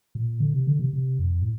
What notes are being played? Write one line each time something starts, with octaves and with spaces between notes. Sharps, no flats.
A#2
D3
C3
D3
C3
C3
F2
A2